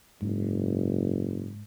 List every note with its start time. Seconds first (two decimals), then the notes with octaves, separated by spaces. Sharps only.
0.22 F#1 G#2